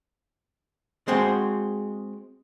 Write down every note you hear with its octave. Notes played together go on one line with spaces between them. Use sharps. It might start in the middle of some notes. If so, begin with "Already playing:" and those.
G#3 C4 F#4 G#4